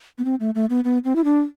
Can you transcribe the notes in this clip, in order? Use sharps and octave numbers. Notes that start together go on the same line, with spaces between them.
B3
C4
A3
A3
B3
B3
C4
E4
D4